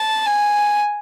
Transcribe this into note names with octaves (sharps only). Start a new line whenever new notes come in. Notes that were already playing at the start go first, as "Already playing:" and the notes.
Already playing: A5
G#5